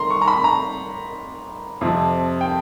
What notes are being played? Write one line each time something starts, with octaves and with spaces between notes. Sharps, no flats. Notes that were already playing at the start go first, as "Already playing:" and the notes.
Already playing: D#3 A#5 C6
C#6
A#5
B5
A#5
F2 C3 F3
G5